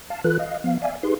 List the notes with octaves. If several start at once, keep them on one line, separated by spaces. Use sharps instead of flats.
F5 A5
E3 F4 A4 B4 F#6
D#5 F5
F3 B3 F5
D5 E5 F5 G#5
D#4 G4 G#4 B4 C6